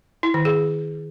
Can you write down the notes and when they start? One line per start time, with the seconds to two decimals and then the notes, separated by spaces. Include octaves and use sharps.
0.23 E4
0.34 D#3
0.45 G#4